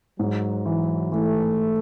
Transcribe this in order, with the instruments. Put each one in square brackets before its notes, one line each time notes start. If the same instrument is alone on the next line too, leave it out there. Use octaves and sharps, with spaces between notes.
[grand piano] G#2 [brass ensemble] F#3
[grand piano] E3 [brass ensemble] F#3
[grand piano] E3 [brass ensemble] A3